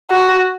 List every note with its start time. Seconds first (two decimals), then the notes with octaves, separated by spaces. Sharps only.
0.11 F#4